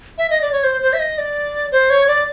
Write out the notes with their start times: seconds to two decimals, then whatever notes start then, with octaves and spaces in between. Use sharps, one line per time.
0.18 E5
0.30 D#5
0.41 D5
0.52 C#5
0.64 C5
0.82 C5
0.93 E5
0.99 D#5
1.18 D5
1.72 C5
1.90 C#5
2.08 D5